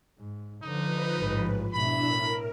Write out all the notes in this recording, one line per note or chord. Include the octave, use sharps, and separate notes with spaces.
G#2
D3 F3 D#4 B4
A1 G#2
G#2 B2 D4 E4 E5 B5
A2 A#4